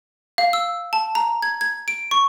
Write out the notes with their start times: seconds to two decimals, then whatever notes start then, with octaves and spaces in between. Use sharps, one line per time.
0.38 F5
0.53 E6
0.93 A5
1.15 A#5
1.42 G#6
1.61 G#6
1.88 D7
2.11 C#6